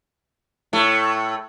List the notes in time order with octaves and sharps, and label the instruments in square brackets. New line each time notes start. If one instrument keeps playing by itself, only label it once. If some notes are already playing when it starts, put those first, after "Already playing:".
[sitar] A2 A3